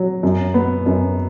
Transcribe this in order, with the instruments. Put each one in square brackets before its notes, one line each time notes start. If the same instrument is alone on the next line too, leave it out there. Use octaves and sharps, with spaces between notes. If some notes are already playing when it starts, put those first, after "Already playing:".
Already playing: [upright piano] F#3
F#2
B3
F#2